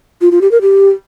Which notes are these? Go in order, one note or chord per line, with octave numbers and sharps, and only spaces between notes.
F4
F4
G4
A#4
G4